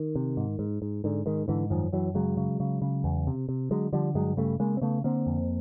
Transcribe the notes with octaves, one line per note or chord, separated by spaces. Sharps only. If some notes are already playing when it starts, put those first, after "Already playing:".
Already playing: D#3
C3
G#2
G#2
G#2
G#2 D3
G#2 D#3
G#2 D3 E3
F#2 D#3 F3
F#2 E3 F#3
C#3 F#3 G#3
C#3
C#3
C#3
E2
C3
C3
D3 F#3 G#3
D3 F3 G3
G2 F#3 G#3
C#3 G3 A3
C#3 G#3 A#3
C4
C#3 A3 B3
D3 A#3 C4
F2